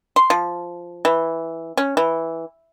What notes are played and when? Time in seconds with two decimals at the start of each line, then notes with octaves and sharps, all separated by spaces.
0.16 C6
0.30 F3
1.05 E3
1.77 C#4
1.97 E3